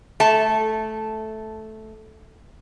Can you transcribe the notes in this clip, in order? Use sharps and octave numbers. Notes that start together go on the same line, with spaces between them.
A3 A5